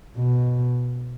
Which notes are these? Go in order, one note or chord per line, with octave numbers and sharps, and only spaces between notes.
B2